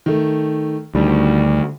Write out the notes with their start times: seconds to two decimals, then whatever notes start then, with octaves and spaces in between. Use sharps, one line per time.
0.06 D#3 A3
0.95 D2 D#3 G3